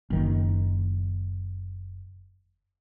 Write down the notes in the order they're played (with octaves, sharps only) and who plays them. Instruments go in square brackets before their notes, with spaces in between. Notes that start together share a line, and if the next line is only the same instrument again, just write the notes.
[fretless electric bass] F#1 D#3